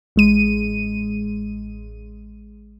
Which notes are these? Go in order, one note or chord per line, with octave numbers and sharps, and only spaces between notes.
A1 G#3 D#7